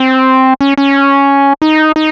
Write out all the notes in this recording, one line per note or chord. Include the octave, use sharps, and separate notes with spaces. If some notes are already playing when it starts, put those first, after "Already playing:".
Already playing: C4
C#4
C#4
D#4
D#4